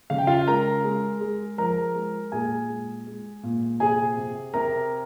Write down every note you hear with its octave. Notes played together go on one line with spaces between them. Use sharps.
C#3 F5
G5
F4 F5
G#3 A#4 A#5
G#3
G#3
F3 A#4 A#5
G#3
A#2 G#4 G#5
G#3
G#3
A#2
C3 G#4 G#5
C3
C3 A#4 A#5